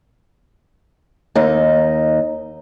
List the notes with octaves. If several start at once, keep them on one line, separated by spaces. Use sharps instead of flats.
D#2 D#4